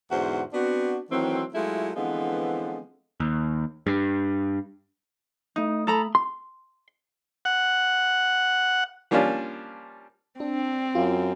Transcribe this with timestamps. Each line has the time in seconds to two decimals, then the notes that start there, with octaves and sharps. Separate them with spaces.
0.10 E2 G#2 D3 F#4 C5
0.53 B3 C4 D4 F#4
1.11 D#3 E3 F#3 A3 C4
1.54 F#3 G#3 A3 E4 F4
1.96 D3 E3 F3 G#3 B3 C4
3.20 D#2
3.87 G2
5.56 A3 D#4 D#6
5.87 A4 A#5 B5
6.15 C6
7.45 F#5
9.11 F3 G3 A#3 C#4 D4 F4
10.40 C4 D4
10.95 F#2 F4